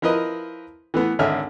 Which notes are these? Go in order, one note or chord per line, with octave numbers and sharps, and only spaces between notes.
F3 E4 A#4 B4 D#5
E3 A3 B3
G#1 D3 C#4 G#4 E5 F6